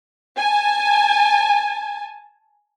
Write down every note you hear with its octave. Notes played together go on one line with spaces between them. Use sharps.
G#5 A5